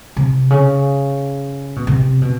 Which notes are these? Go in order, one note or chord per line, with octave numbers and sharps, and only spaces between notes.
C3
C#3
B2
C3
B2